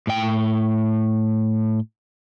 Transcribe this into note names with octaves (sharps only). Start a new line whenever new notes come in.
A2 G5